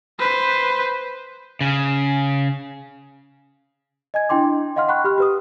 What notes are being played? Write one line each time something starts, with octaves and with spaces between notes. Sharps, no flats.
B4 C5
C#3
D#5 G#5 G#6
D4 E4 G5 C6 D6
D#5 F5 F#5 C6 F6
F#5 G5 B5 C#6 F#6
G4 B5 F6
G4 B4 D#6